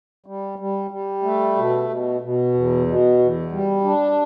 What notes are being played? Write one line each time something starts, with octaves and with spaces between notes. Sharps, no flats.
G3
G3
G3
A3
B2
B2
B2
E2
B2
E2
G3
D4